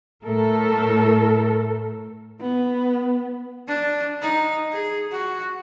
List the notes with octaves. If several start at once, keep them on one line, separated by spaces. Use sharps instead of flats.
A2 A3 A4 A#4
B3
D4
D#4
G#4
F#4